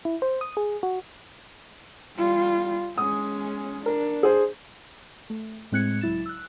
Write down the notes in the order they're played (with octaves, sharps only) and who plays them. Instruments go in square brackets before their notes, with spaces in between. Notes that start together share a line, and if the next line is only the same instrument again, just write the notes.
[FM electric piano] E4
C5
D#6
G#4
F#4
[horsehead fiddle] G3 F4
[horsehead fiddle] G#3 C#4 [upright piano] D#6
[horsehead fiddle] D4 [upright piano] A#4
[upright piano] G#4 C5
[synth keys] A3
A2 G#3 C4 F#6 G#6 C#7
C#2 F#3 E4 A6 E7
E6 F#6